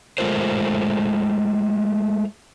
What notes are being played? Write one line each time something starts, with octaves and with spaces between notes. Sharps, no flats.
G#3 A3 F4 A#4 C5